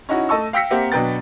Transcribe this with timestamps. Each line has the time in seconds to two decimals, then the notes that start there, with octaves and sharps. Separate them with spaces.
0.09 C#4 D#4 E4 F#4
0.29 A3 D#5 A5 C#6 E6
0.53 F5 G5 E6 A#6 B6 C#7
0.70 A#3 C4 G4 E5 F#5
0.92 B2 F#3 D4 B4 G5 A6